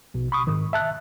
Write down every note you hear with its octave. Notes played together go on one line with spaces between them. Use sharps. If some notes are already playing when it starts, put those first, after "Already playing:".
A#1 B2
B5 C#6 D#6
G#2 D#3
E5 A5 F#6